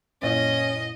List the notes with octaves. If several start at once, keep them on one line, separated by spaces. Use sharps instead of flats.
F#2 A#2 C#4 E4 D#5